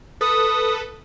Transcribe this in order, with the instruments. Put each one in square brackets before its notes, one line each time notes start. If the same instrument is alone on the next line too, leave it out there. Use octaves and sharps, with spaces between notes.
[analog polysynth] A4 B4 [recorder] D#6